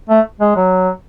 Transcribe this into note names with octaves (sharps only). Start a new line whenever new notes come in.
A3
G#3
F#3